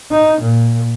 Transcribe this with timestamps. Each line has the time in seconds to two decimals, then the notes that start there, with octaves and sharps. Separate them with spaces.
0.11 D#4
0.41 A#2